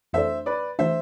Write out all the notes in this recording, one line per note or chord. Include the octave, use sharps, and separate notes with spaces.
F2 E3 A3 D4 C5 E5
B4 D5
E3 A3 D4 C5 E5